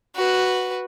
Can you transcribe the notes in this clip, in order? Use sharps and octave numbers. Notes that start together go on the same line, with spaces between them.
F#4 B4